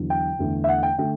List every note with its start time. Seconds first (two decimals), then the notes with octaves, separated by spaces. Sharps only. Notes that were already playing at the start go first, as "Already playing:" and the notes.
Already playing: E2 D3 F#3
0.10 G5
0.39 E2 D3 A3
0.64 E5
0.69 F#5
0.83 G5
0.98 D3 A3 G5